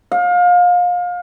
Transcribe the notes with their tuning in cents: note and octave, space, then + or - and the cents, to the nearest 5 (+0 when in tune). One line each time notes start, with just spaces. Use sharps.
F5 +30